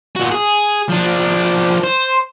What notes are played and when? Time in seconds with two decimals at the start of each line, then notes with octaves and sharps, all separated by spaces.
0.16 A#2 F#4
0.31 G#4
0.89 F3 D4
1.83 C5